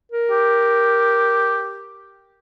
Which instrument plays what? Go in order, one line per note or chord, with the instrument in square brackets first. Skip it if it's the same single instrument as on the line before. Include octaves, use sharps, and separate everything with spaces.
[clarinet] A#4
[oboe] G4